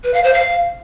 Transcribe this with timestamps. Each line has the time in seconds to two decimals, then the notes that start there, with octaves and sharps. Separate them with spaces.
0.04 B4
0.14 F5
0.24 C5
0.34 F5